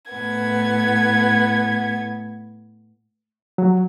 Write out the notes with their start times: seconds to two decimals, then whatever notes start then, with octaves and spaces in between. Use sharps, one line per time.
0.11 A2 B3 G#6
3.58 F#3